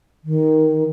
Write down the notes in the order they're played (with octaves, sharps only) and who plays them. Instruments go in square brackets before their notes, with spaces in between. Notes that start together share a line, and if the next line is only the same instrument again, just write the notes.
[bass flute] D#3